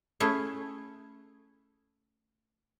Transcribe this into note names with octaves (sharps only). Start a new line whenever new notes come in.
A3 C#4 E4 G#4